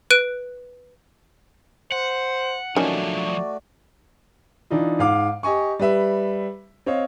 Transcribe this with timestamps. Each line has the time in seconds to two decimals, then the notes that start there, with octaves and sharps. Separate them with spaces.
0.10 B4 F#6 D7 D#7
1.92 C5 F#5
2.76 D#3 F3 F#3 A3 C#4 D4 F#4 D5
4.70 E3 D4 D#4 F4
4.99 G#2 F5 D6
5.43 G4 D#5 G#5 C#6
5.79 G3 G4 B4 E5
6.86 C4 C#5 D#5 F5